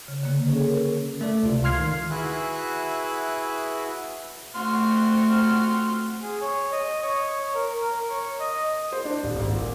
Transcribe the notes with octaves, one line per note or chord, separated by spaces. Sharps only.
C#3
D3 A#3
C#4 G#4 A4 C#5
A#4
A3 A4 D5
C#2 C3 F4
F5 C6 F6 G#6 C7
D#3
E4 F#4 G#4 B4 E5 F#6
A3 C4 F#4 C6 F6
G#4
C#5
D#5
C#5
A#4
A#4
C#5
D#5
C5
D4
D#1
G#1
A#2